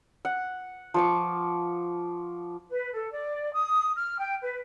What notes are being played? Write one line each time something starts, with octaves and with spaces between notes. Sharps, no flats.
F#5
F3 C#6 D6
B4
A4
D5
D#6
F6
G5
B4